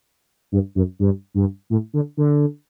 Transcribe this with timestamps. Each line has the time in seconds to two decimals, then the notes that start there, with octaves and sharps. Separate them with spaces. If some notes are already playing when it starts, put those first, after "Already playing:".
0.52 G2
0.75 F#2
0.99 G2
1.35 G2
1.70 A2
1.94 D3
2.17 D3